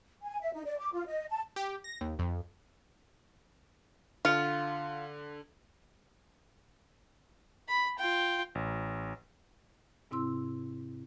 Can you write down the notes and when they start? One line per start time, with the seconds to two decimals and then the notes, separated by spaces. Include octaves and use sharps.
0.23 G#5
0.41 E5
0.54 D#4
0.66 D5
0.78 D6
0.93 F4
1.07 D#5
1.30 A5
1.56 G4
1.84 A#6
2.01 D#2
2.19 F2
4.25 D3 F4 C#7
7.69 B5
7.99 F4 G5
8.55 A1
10.11 G#2 C3 C4 E4 C6 E6